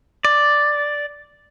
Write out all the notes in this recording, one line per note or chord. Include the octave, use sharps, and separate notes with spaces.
D5